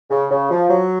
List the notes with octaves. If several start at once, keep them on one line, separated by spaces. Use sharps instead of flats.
C#3
C#3
F3
F#3